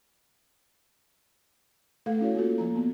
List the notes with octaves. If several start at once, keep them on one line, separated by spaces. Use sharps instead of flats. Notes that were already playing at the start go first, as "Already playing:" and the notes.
A3 A4 F5
C#4 E4 F#4 C#5
A#3 F4 F#4 A4
F3 A#3 A#5
B3